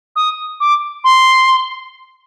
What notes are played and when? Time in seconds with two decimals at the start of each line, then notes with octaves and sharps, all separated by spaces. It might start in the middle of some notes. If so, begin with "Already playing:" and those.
0.16 D#6
0.60 D6
1.04 C6